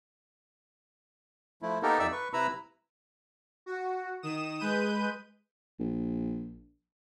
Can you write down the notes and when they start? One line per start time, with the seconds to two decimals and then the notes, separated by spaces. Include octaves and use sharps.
1.62 F3 A3 E4
1.83 A#3 B3 D#4 G4 A4 A#4
1.99 F2 D#4 D5 E5 E6
2.12 B4 C#6
2.33 C3 E4 B4 A#5 B5 E6
3.66 F#4
4.22 D#3 D#6 E7
4.59 G#3 B4 G6 D#7
5.79 A#1